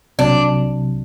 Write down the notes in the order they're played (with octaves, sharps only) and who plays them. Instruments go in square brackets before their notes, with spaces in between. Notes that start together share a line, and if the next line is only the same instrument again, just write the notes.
[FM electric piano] C2 C3 F#3 [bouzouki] D4